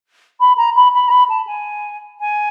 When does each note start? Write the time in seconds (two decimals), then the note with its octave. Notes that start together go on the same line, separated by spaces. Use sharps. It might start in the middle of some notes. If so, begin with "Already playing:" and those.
0.40 B5
0.57 A#5
0.75 B5
0.94 B5
1.08 A#5
1.11 B5
1.29 A5
1.47 G#5
2.20 G#5